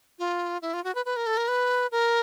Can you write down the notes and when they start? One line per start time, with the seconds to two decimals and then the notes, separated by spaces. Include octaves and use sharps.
0.19 F4
0.62 E4
0.74 F4
0.84 F#4
0.95 B4
1.05 B4
1.16 A#4
1.26 A4
1.37 A#4
1.48 B4
1.91 A#4